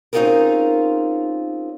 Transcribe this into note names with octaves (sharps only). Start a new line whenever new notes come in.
C4 C#4 D#4 F4 G#4 A#4